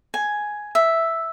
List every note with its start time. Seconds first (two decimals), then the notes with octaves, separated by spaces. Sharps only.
0.14 G#5
0.75 E5